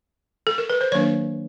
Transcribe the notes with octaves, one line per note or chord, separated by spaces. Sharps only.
A4
A#4
B4
C5
D#3 F#3 A#3 D4 C#5